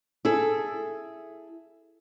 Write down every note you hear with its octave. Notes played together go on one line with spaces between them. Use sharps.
E4 G#4 A4